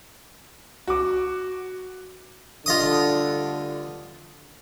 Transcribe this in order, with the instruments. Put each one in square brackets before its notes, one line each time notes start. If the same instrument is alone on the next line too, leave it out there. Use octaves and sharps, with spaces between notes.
[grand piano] F#4 D6
[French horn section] D2 G2 D3 [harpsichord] F4 D#5 D#6